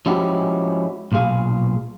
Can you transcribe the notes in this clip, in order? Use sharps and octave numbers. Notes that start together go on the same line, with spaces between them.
F3 G#3 C#4 E4 F#4 G4
B1 A#2 F4 G#4 F5